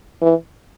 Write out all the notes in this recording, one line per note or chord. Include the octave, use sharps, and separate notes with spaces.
E3